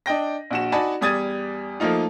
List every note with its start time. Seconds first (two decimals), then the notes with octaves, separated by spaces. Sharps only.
0.06 D4 D#5 G5 A#6
0.51 A#1 F#4 E7
0.72 D#4 F#4 D5 G#5 A5 B5
1.01 E2 G3 D#6 G#6 A6 D#7
1.80 F3 A3 A#3 D#4 F4